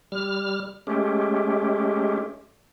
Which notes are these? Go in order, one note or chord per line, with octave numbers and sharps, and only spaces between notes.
G3 F6
G#3 A3 C#4 G4